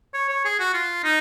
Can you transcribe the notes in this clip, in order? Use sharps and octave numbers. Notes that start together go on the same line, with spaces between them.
C#5
C#5
G#4
F#4
F4
D#4